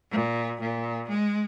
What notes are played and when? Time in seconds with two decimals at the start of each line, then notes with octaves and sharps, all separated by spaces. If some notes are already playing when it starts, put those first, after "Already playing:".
0.11 A#2
0.60 A#2
1.09 G#3